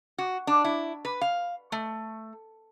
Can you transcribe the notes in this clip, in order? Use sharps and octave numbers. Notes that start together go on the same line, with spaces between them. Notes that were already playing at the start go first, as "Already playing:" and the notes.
F#4
D4
E4
B4
F5
A3